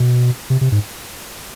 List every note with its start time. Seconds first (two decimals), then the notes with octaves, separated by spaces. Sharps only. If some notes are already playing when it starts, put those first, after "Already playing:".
Already playing: B2
0.50 C3
0.61 C3
0.72 G#2